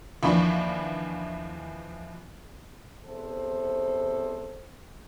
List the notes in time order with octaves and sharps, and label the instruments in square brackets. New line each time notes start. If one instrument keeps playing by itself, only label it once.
[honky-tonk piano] D#2 E3 F3 D4 B5 C#6
[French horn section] E2 C3 A4 C5